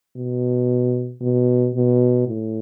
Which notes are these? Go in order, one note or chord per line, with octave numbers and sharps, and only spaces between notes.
B2
B2
B2
A2